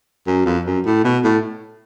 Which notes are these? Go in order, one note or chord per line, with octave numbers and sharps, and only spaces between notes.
F#2
F2
F#2
A2
B2
A2